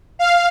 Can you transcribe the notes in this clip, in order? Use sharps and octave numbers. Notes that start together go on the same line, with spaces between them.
F5